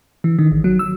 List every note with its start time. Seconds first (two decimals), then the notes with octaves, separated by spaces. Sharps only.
0.24 E3
0.39 D#3
0.51 G#1
0.64 F#3
0.79 E6